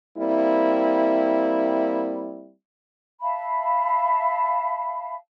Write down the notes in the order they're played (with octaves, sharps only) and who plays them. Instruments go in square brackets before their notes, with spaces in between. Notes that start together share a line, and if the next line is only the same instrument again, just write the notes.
[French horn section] G3 A#3 C4 E4
[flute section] E5 F5 A5 B5